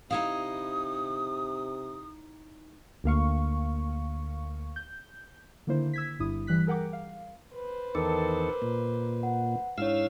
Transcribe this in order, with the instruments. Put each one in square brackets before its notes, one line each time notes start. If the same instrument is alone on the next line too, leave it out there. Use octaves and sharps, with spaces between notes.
[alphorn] C3 [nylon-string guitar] D#4 E4 F5 [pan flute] D#6
[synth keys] D2 A#3 F5 C#6
G6
D3 D#3 A#3 E4 C5
E6 G#6 B6
G1 G2 E4 D#6
E3 G3 F#6 B6
G#4 A#4 F#5 G5 D6
F5
[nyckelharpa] B4 C5
[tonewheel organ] E2 D#3 A4 [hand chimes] A#4 D6
[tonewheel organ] A#2
[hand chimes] F#5
[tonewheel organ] G#2 F5 E6 [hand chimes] D4 E4 C#5